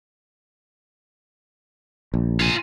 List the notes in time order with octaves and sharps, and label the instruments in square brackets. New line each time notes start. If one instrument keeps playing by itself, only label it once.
[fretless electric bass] A#1
[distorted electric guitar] F4 G#5